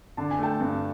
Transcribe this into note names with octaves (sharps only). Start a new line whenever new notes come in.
D3 A5
G#5
A3 G5 A5
G2